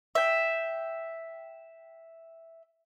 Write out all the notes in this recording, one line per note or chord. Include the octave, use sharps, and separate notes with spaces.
E5 G5